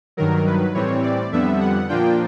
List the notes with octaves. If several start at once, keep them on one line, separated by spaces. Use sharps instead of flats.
G2 D#3 F#3 A#4
B4
A2 E3 G3 C4 C#5
D5
F2 D3 G3 B3 E5
F#5
A#2 F3 A#3 D4 F4 G5